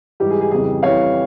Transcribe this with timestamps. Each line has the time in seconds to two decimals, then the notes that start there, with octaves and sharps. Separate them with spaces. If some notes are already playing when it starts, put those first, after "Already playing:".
0.20 G#2 E3 G3 G4
0.30 G#4
0.41 G#4
0.51 F2 C#3 E3 G3 G#4
0.83 F2 E3 G3 C#5 F5